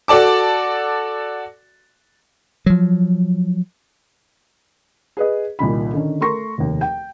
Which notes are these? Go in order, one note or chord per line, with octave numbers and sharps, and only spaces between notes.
F#4 A4 D5 A5 D6
F3 F#3
G#4 B4 D#5
C2 A#2 D#3 B5
D3 D#3 C#4
A3 A#4 C6 C#6 A#6
F1 D#2
G5